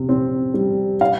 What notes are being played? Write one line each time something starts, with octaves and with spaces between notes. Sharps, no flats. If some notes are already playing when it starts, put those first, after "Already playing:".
Already playing: C3
C4
G3
F5